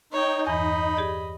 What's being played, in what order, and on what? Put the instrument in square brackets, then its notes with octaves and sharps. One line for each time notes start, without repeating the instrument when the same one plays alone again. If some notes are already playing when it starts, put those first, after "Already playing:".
[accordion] D#4 [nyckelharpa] C#5 G5
[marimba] E2 G2 E3 [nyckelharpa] D#5 B5
[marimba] G4 G#4 D5